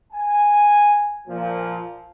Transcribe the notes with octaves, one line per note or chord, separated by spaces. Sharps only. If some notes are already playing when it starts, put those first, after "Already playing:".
G#5
A#2 F3